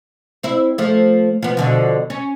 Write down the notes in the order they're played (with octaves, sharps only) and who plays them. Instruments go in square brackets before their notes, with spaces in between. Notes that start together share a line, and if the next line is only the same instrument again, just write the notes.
[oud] C4 E4
F3 A3
F3 B3
B2 D3 F3
C#4